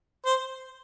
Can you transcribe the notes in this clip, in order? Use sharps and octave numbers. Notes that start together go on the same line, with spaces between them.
C5